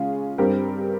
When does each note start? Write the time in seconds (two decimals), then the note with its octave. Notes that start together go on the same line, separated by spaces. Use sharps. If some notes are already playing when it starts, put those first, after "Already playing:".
Already playing: C#3 G#3 C#4 F4 G#4
0.38 G2 G3 C4 G4 A#4